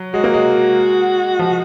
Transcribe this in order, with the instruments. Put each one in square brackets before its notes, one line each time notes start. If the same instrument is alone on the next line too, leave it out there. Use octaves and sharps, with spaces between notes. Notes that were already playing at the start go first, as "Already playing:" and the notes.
Already playing: [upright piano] F#3
[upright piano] G#3 [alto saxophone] F#4
[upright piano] A#3
G#3
F3